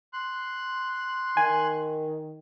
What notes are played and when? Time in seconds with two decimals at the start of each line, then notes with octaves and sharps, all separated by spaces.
0.13 C6 F#6
1.37 D#3 G#5